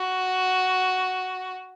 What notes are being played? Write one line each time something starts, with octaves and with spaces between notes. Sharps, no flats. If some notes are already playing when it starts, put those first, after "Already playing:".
Already playing: F#4